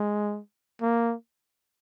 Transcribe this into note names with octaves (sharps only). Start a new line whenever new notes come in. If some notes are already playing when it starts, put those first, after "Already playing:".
Already playing: G#3
A#3